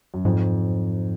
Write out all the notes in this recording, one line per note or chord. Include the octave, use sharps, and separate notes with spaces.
F#2
F2 G#2